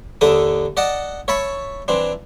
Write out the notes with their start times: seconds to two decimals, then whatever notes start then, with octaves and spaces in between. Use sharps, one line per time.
0.21 D#2 D3 D4 A4 E5 D#6
0.77 D5 D#5 F#5 A5
1.28 C#5 E5 A5 B5 C#6
1.88 E3 C4 D4